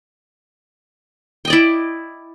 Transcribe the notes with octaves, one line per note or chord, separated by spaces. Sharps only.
E4 D5 D#5 G5